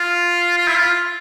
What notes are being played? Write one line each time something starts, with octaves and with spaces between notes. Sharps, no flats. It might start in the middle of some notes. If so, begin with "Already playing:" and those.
Already playing: F4
F4
E4
F4